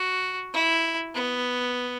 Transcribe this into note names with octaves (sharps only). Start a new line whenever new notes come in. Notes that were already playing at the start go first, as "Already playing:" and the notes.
Already playing: F#4
E4
B3